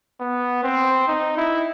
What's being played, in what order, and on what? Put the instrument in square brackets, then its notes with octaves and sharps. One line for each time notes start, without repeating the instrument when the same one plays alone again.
[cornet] B3
C4
D#4
E4